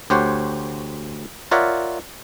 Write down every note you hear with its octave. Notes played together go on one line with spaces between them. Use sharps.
D2 G4 C5 C#5 F#5
F4 A#4 C#5 D5 E5 F#5